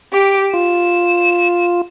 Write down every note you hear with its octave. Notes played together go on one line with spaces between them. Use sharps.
G4 D6
F4 E7